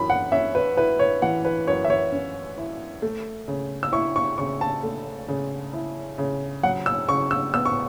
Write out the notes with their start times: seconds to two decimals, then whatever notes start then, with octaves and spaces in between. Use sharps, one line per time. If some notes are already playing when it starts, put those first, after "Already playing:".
Already playing: F#2 E3 B5
0.10 F#5
0.32 C#4 E5
0.55 B4
0.77 E4 B4
0.99 C#5
1.22 E3 F#5
1.45 B4
1.67 F#2 C#5
1.85 E5
1.90 C#5
2.12 C#4
2.58 E4
3.02 A3
3.48 C#3
3.83 E6
3.92 E4 C#6
4.16 C#6
4.38 C#3 C#6
4.61 A5
4.83 A3
5.28 C#3
5.73 E4
6.18 C#3
6.63 F#3 F#5
6.86 E6
7.09 C#3 C#6
7.31 E6
7.54 B3 E6
7.66 C#6